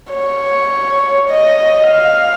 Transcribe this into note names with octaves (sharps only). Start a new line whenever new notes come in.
C#5
D#5
F5